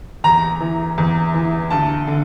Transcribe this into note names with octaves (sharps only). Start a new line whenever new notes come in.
E2 A#5
E3
E2
E3
D2 A5
D3